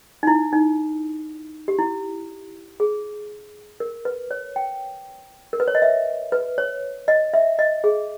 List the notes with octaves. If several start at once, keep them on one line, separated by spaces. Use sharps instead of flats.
D#4
E4
D#4
G4
E4
G#4
A#4
B4
C#5
G5
A#4
B4
C#5
D#5
E5
B4
C#5
D#5
E5
D#5
G#4